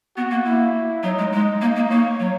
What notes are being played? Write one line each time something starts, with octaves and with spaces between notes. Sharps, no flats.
B3 F#4
A#3
A#3 E4
F#3 D#4
G#3
G#3 D#4
A#3 D#4
A#3
A#3 C#5
F#3